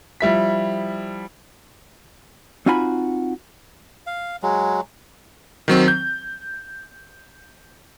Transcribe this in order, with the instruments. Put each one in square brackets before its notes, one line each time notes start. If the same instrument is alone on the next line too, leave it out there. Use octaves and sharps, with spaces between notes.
[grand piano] F3 G3 E4 B6
[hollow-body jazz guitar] C4 D#4 F4 F#4 G#5 B5
[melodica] F5
F#3 G#3
[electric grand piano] D#3 F#3 C4
G6